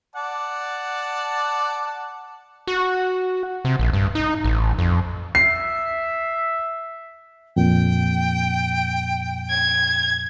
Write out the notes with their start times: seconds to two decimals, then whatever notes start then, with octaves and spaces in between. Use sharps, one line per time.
0.16 D5 F#5 A5
2.68 F#4
3.65 C3
3.79 A#1
3.93 G2
4.15 D#4
4.44 A1
4.78 F2
5.35 E5 C7
7.56 F2 A#2 G5
9.50 G#6